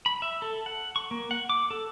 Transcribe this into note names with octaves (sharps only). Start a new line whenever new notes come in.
B5
E5
A4
F#5
C#6
A#3
F#5
D6
A4